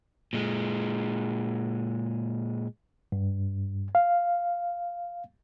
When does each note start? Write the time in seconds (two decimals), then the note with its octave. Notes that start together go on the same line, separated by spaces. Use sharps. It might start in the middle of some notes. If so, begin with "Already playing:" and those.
0.33 A#2 G#3
3.12 G2
3.95 F5